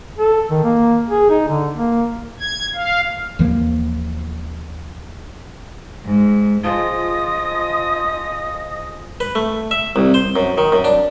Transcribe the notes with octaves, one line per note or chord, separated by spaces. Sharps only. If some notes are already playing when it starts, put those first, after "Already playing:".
A4
D#3
A#3
G#4
D#4
D3
A#3
G#6
F5
D#2 E3 F3 A#3
G#2
F3 F4 G#4 D#5 D#6
B4
A3
E5
C2
C5
F#2
D#3
F#2
D4